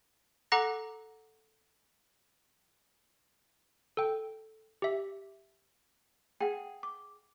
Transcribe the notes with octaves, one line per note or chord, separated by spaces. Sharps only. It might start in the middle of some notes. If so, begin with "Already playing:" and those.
A4 F#5 A#5 D6 F#6 A#6
A4 G5
G4 E5
G#4 F#5 G5
D6